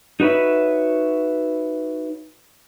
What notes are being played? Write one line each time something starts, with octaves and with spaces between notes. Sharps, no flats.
D#4 F#4 B4 C#5 E5